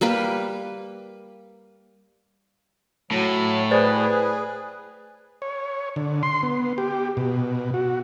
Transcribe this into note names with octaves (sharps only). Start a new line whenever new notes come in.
G3 A#3 G4 B4
A2 F#3
G#4 B4 C5 D5 A6
C#5
D3
C6
B3
G4
B2
F#4